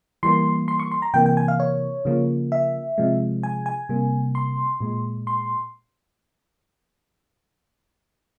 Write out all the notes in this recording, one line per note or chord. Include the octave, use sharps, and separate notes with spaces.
E3 G3 A#3 C6
C6
C#6
C6
A#5
C3 E3 A#3 G5
G5
G#5
F5
C#5
C#3 F3 A#3
E5
C3 F3 G#3
G#5
G#5
C3 G3 A#3
C6
A#2 G#3
C6